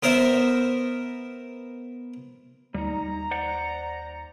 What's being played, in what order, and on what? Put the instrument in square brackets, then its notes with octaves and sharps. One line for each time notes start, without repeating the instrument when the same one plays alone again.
[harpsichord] B3 A#4 C5 E5
[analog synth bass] D#2 [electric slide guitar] G3 D#4 [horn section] A#5
[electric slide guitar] C5 D5 F#5